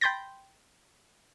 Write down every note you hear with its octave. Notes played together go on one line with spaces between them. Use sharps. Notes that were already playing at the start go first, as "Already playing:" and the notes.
G5 B5 C6 G6 A6 A#6